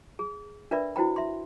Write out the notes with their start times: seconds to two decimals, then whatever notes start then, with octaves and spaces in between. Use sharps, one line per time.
0.19 G#4
0.71 D4 A#4 B4 D5 E5 B5
0.96 E4 F#4 C5 G5 B5
1.16 E5 C6